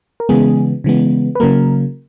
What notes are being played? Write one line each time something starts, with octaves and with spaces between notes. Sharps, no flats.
A#4
C#3 E3 G#3 B3 G#4
C#3 E3 G#3 B3
B4
C#3 F#3 A#3 A#4